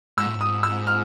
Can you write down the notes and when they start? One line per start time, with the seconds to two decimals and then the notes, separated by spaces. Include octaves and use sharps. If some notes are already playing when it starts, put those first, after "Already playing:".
0.18 G#2 E6
0.26 A2
0.35 G#2
0.41 D#6
0.63 E6
0.87 F6